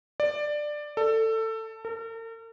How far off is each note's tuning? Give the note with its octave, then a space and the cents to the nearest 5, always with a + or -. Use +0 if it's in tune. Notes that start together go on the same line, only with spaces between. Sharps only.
D5 +15
A4 +20
A#4 -45